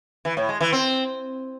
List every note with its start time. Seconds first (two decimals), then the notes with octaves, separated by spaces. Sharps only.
0.25 E3
0.37 A2
0.49 G#3
0.61 E3
0.72 C4